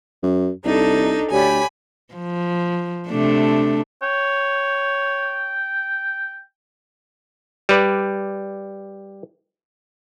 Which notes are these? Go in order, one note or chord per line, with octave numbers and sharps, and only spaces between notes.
F#2
C2 D4 D#4 A4
D2 G4 C#5 D5 G#5 B5
F3
C3 A3 D4
C#5 G5
G3 B4 D5